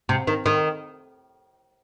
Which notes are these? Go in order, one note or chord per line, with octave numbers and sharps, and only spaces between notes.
C3
D#3
D#3